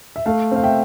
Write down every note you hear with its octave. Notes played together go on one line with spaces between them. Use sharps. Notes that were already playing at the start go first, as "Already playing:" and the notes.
E5
A3 F5
C4 F5
E5 G5